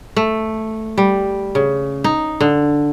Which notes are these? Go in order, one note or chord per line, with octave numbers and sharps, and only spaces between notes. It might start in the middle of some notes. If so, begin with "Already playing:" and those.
A3
G3
C#3
D#4
D3